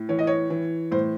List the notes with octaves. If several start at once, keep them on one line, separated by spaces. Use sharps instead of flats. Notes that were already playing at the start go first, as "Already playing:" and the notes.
Already playing: A2
E3 C#5
D#5
C#5
E3
A2 C5